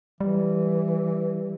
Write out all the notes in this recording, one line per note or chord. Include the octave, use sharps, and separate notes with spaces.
E3 G3